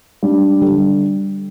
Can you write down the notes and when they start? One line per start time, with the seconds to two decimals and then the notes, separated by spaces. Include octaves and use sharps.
0.23 G3 D4
0.61 D3 G3